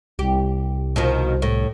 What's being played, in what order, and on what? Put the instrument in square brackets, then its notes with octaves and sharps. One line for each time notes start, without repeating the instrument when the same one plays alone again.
[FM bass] C2 [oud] G4
[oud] B2 D#3 F3
A2